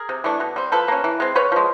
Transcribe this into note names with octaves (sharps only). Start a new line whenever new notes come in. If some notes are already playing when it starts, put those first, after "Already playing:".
Already playing: G#4 A#4
C3
E3 A3 D4
B2
G3 C4
F3 A4 B4
A#3 C#4
E3
G#3 C4
C#3 B4 C#5
F3 G#3